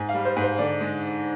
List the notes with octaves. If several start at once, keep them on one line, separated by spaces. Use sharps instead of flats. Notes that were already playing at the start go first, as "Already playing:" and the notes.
Already playing: G#2 G#5
F5
G3
C5
G#2
C5
D3 D5
G#3